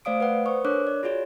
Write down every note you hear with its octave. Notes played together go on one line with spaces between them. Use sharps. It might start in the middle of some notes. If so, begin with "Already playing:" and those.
A3 C5 D5 F5 D#6 D7
B4 D5 F#5
B4 C5 C#6 D#6
D4 A#4 C#5 D6 F#6
D5
F4 F#4 G#4 C#5 D5